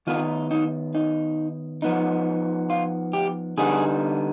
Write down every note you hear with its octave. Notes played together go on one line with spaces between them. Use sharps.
D#3 B3 D#4 F4
D#4
D#4
F3 B3 D#4
F4
G4
D3 G3 B3 D#4 G#4